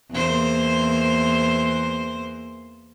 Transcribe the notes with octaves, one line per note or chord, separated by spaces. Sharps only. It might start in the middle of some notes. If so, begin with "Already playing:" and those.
E2 A#3 C5